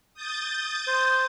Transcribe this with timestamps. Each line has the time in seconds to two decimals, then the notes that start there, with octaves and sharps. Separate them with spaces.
0.14 D#6 G6 A6
0.87 C5